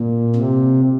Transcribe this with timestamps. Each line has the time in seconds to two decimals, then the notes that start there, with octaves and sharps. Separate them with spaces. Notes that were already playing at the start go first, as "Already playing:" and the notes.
Already playing: A#2
0.35 C3